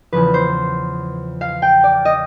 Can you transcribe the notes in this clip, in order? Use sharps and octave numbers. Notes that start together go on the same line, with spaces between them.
E2 C#3 F3 B4
C5
F5
G5
D5
D#5